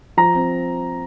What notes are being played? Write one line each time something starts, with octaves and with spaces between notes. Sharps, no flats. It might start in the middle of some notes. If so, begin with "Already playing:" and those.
F3 A#5
C4